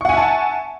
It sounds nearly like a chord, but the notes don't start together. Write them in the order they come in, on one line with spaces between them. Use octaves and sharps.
C#6 F#5 G#5 E5 A5